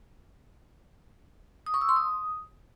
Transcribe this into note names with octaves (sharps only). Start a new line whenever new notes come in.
D#6
C#6
E6
C6
D#6